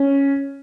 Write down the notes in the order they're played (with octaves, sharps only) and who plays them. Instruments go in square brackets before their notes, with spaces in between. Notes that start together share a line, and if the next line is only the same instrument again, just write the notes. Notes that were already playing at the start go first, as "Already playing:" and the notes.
Already playing: [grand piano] C#4